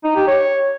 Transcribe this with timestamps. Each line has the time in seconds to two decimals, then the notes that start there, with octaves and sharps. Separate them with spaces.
0.04 D#4
0.16 G4
0.27 C#5